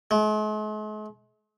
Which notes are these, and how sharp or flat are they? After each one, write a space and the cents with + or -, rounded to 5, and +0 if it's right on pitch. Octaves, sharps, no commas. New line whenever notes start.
G#3 +45